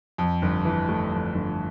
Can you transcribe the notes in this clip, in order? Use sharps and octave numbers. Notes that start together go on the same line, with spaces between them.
F2
G1
E3
A3
F2
G1